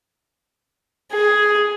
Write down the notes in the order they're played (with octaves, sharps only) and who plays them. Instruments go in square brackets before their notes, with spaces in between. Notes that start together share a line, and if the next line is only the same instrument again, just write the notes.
[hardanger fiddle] G#4